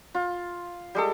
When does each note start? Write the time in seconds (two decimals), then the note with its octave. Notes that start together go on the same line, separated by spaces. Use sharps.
0.15 F4
0.95 G3 G#3 A4